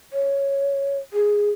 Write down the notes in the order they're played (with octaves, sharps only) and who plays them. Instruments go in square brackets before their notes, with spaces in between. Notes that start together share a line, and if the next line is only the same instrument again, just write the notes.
[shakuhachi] C#5
G#4